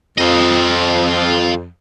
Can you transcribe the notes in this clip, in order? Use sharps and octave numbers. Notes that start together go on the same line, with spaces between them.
F2 F4 D#5